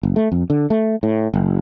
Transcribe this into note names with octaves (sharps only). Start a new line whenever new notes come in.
F#1
A3
F2
D3
A3
A2
F#1